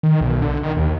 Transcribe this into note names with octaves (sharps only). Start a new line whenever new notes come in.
D#3
B1
D3
D#3
D#2